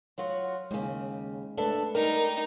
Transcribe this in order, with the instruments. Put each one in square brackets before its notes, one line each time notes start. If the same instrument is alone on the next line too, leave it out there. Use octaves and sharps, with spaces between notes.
[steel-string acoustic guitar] F#3 F4 F#4
[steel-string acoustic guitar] D#2 C#3 [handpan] G#3
[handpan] A3 B4 [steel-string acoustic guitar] D4 A4 E5
[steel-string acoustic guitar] G3 [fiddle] D#4 [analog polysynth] A#4